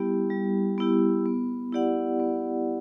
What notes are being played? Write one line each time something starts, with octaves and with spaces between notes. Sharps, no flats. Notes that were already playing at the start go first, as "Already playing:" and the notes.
Already playing: G3 B3 E4 G4
G3
B3 E4 G4
B3
E4 G4 D5 F#5
B3